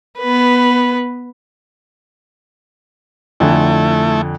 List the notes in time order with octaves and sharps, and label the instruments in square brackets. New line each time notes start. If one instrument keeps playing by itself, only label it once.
[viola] B3 B4
[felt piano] F2 D3 G#5 [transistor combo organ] A3 E4